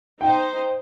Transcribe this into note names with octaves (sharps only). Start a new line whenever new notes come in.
D#4 C5 G5